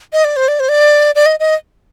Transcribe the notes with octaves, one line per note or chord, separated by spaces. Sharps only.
D#5
D5
C5
D5
C5
D5
D5
D#5
D#5